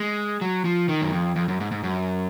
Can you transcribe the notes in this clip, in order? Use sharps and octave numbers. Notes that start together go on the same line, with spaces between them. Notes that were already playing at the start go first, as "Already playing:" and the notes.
Already playing: G#3
F#3
F3
D#3
F#2
F2
F2
F#2
G#2
G#2
F#2